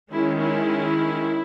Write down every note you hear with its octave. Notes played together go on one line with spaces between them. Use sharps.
D#3 G#3 C#4 E4
E4